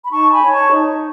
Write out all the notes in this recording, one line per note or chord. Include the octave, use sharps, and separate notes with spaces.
B5
D#4 A5 C#6
G#5 B5
C#5
A5 C#6
D#4